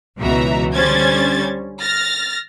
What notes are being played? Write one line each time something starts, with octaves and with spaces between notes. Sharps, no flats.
C#2 B2 E3 F#4 E5 A#5
D3 G3 C#4 C5 G#6 A6
F6 A6 A#6